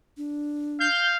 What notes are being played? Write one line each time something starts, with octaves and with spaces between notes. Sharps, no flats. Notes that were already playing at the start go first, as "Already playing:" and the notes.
D4
F5 G6